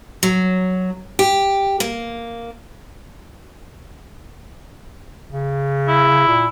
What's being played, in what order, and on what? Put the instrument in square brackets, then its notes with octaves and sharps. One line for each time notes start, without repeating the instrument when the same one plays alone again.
[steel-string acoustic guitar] F#3
G4
A#3
[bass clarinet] C#3
[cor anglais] E4
[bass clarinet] A#2